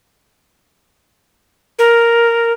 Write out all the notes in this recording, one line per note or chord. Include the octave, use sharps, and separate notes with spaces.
A#4